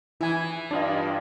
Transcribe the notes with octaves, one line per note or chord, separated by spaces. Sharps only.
E3 E4 G#5
G2 D4 F4 D#5